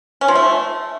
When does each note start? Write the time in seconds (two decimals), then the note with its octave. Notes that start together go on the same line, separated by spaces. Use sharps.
0.21 C#4
0.28 F3
0.35 A3